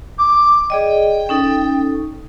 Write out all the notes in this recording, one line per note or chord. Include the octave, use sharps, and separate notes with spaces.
D6
G#4 D5 D#5 G5
C#4 D#4 A4